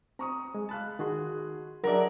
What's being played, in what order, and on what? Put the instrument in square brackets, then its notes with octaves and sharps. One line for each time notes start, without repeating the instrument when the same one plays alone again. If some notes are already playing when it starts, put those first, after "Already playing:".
[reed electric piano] C4 [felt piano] A#5 C#6 D#6
[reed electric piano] G#3
[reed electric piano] F5 A5 [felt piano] B5 F#6
[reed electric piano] D#3 F#4 C6 [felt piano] G#4
[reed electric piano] F#3 E5 [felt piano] D4 G#4 F#5 [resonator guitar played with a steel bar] A#4 D5